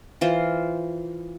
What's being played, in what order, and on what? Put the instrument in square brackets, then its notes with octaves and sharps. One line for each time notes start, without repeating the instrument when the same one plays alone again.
[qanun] E3 F4 C5